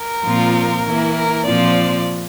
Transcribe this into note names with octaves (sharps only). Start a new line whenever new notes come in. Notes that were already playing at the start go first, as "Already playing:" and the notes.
Already playing: A#4
A#2 F3 C4 F4
E3 A#3 E4
A#4
A#2 F3 C4 F4 D5